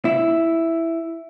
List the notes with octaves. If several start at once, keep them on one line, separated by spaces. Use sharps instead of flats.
E4